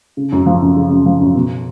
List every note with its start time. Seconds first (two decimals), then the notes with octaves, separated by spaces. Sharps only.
0.17 C#3
0.32 F#2
0.46 F3
0.62 F#2
0.77 C#3
0.91 F#2
1.06 F3
1.21 F#2
1.36 B2